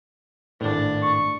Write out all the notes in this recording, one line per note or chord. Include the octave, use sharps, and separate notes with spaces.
G#1 A2 D4
C#6